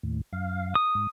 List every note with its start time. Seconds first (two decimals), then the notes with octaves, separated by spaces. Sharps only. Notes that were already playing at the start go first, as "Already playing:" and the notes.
0.03 D#2 A2
0.33 F#2 F5
0.75 D#6
0.95 G#2